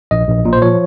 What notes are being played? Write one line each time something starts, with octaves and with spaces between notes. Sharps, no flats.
A#1 D#5
A#1
A#2
C5
F3 C#5